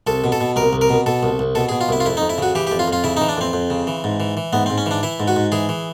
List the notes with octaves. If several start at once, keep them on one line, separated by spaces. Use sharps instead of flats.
C2 A4
B2
A4
B2
C2 A#4
C2
A#4
B2
B2 A4
C2
C2
B2 A4
B2 G#4
F4
C2 E4
F4
F2 E4
D#4
F2
E4
C#3 F#4
E3 G4
G4
F2
F4
F2
F4
C#3 E4
D#4
E3
D4
F2 C4
F2
C#3
E3
G#2
E3
E3
G#2 B3
C4
G#2
C#4
E3 D4
E3 E4
G#2
F#4
G#2
E3 G#4
E3